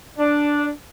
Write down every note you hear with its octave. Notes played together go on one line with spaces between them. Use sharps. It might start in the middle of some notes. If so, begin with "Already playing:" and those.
D4